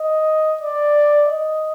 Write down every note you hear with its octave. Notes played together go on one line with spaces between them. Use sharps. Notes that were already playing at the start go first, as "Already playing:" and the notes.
Already playing: D#5
D5
D#5